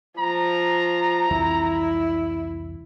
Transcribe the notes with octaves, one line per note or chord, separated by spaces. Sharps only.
F3 A#5
C2 F2 E3 E4